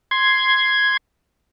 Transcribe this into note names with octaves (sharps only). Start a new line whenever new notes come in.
C6 G#6